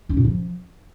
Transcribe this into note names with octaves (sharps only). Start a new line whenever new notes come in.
C#4
A#2
F3